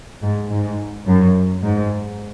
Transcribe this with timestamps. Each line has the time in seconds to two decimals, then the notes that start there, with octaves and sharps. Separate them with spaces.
0.23 G#2
0.50 G#2
1.07 F#2
1.63 G#2